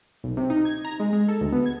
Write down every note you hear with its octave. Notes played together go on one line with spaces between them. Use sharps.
B1
C3
D#4
G#6
A#5
G#3
G#3
A4
D2
B3
G#6